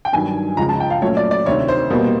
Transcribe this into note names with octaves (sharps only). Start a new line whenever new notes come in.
G5
G2 D#3 F#3 G#5
C#2 C#3 F3 A#5
A5
G5
F5
A#2 F#3 A3 C#4 C#5
D5
D5
D2 C3 D#3 C#5
C5
B2 G3 A#3